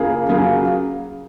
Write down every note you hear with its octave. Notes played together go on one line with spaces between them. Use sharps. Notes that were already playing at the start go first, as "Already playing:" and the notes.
Already playing: C#3 A#3 F4 G#4
C#3 F#3 A#3 F4 G#4